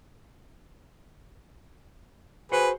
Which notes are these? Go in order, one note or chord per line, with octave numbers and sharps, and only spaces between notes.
F#4 G#4 B4 C5 F#5